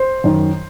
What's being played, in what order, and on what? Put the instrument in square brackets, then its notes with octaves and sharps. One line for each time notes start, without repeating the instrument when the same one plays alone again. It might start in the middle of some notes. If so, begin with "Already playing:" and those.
Already playing: [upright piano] C5
F#2 D#3